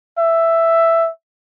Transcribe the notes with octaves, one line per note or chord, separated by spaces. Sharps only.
E5